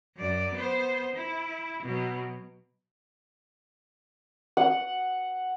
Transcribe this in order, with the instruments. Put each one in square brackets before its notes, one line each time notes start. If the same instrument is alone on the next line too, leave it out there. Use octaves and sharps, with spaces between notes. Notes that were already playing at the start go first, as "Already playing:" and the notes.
[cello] F#2 D5
B3 C5
E4
B2 F#3
[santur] F#5